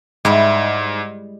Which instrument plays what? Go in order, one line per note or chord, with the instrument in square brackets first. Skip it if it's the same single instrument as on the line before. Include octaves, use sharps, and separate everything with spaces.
[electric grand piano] G#2 [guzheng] G3 G#3 E4